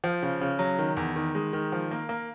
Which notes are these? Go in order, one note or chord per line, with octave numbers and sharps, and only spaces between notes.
F3
C#3
C#3
F#3
D#3
E2
D#3
G#3
D#3
F3
A#3
A#3